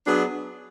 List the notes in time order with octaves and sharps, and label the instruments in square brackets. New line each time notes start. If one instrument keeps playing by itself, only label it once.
[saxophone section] F#3 B3 D4 G#4